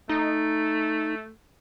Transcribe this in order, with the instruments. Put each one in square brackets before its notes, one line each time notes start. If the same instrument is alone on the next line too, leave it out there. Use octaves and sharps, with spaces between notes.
[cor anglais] A3 [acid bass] D#4